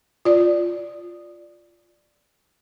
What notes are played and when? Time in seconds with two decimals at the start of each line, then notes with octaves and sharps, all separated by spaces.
0.25 F4 D5